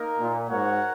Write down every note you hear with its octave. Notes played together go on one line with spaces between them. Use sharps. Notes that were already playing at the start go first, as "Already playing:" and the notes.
Already playing: A#3 D#4 A#4
A#2
G#2 F#4 A#4 C#5 F#5